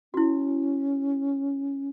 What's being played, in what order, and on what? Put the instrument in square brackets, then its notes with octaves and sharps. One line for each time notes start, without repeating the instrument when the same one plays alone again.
[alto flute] C#4 [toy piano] E4 F#4